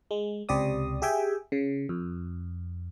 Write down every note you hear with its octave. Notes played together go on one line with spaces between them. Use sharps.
G#3
C#2 C3 G4 D5 D#6
G4 G#4 E5 G5 G#5
C#3
F2